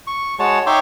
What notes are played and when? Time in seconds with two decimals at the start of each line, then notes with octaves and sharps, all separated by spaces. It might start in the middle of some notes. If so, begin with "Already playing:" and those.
0.07 C#6
0.39 G#3 F#4 C#5 A5
0.67 D#4 C#5 E5 G5 C6 D6